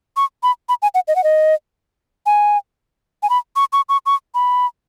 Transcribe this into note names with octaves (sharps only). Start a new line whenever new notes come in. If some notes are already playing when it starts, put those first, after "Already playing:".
C#6
B5
B5
G#5
F#5
D#5
F#5
D#5
G#5
G#5
B5
C#6
C#6
C#6
C#6
B5